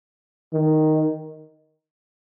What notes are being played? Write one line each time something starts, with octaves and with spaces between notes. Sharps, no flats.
D#3